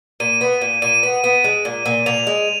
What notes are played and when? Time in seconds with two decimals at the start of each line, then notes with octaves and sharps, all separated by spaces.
0.20 A#2 D#7
0.41 B3
0.61 A#2
0.82 A#2 D#7
1.03 B3
1.24 B3
1.44 G#3
1.65 A#2
1.86 A#2
2.06 A#2 F7
2.27 G#3